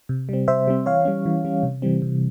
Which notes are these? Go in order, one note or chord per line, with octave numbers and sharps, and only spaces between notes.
C3
G3 C4
C3 C5 E5
G3 C4
E3 C#5 F5
G3 C#4
E3
G3 C#4
C3
E3 G3 C4
C3